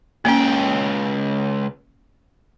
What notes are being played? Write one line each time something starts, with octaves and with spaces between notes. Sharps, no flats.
C#2 A#3 C#4 G5